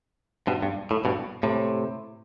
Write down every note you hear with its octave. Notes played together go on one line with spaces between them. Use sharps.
G2 B2
G2
A2
G2 B2
A2 C3